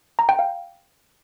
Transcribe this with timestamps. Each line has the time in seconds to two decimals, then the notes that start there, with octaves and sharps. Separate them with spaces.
0.19 A#5
0.29 G5
0.39 F5